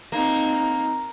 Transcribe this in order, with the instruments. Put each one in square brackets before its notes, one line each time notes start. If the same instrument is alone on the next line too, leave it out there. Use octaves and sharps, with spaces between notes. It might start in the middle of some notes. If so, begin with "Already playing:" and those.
[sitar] A#3 [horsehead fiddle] C4 D#4